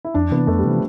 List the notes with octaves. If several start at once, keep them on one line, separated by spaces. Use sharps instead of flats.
E4
F2 D4
C3 E3 B3
F2 A3
G3
C3 E3 F3